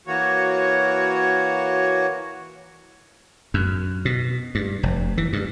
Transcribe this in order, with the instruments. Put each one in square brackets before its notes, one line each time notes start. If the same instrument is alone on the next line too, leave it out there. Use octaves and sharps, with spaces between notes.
[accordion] E3 A#3 F#4 C#5
[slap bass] F#2
B2
G2
F1
E3
G2